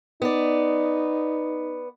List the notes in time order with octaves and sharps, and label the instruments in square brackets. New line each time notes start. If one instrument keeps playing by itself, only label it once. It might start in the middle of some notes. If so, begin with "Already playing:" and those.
[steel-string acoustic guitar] B3 D5 [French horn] D#4